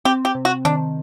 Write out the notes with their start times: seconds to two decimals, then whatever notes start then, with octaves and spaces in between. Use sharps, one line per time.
0.05 C4 G4
0.25 G4
0.35 C3
0.45 F#4
0.65 D#3 D4